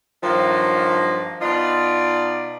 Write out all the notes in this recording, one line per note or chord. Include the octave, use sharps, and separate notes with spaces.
G2 D#3 F3 F#3 A#3
B2 D#4 F4 D5